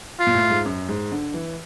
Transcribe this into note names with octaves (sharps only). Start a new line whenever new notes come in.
F4
A#2
A2
G#2
F#2
G#2
D3
E3